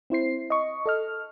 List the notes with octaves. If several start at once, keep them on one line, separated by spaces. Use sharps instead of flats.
C4 E4 C5 C7
D#5 C#6
A4 D#5 F6